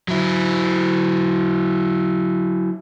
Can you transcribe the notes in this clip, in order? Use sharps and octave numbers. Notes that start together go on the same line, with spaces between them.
F#3 E4